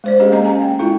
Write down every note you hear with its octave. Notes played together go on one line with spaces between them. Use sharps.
G#3 C5 D5
C#4 G4 G#4 D#5 F5
A#3 C#4 A4 D#5 A#5
F5 G#5 A#5
G5
G#3 E4 F4 A4